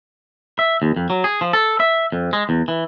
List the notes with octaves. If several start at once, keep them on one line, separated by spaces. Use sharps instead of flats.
E5
D#2
F2
F#3
G#4
F3
A4
E5
F2
G#3
E2
E3